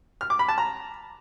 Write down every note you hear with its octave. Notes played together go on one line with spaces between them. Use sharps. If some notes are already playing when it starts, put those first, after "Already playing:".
F6
D6
B5
A5
A#5